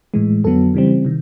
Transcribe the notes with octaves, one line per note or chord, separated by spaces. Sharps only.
A2 E3 G#3
F2 D3 F#3 B3 A4
C#3 E3 G3 C4
C3 D#3